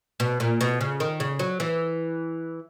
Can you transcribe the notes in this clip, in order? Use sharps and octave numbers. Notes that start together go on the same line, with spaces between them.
B2
A#2
B2
C#3
D#3
C#3
F#3
E3